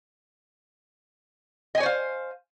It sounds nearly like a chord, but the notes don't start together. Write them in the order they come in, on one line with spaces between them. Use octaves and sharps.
D#5 G#5 C#5 C5 F5